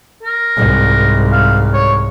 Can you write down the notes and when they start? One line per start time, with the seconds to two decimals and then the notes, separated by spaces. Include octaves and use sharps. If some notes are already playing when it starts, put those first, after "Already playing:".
0.23 A#4
0.57 C2 G#2
1.32 F5
1.74 C#5